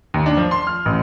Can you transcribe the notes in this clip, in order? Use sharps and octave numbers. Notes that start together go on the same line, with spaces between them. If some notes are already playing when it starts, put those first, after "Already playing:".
D#2
D4
F3
C6
F6
A1